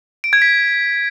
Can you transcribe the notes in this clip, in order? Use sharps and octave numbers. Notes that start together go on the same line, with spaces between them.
D7
G#6
B6